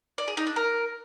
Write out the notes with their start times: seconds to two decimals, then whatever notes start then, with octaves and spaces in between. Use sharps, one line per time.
0.18 D5
0.28 G#4
0.37 D#4
0.47 D4
0.56 A#4